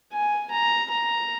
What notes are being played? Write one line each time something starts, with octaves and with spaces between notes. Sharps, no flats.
G#5
A#5
A#5